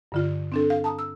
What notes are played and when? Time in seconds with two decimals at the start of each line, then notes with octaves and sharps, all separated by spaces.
0.12 G2 D3 F4
0.52 C4 D4 A4
0.70 F5
0.84 A5 A#5 D#6
0.99 E6